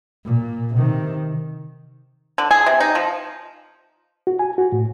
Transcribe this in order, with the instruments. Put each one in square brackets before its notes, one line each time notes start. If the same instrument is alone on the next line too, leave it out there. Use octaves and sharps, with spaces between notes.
[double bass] A#2
C3 D#3
[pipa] D3
G#4
C3
D#4
F3
[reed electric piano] F#4
G#5
F#4
A2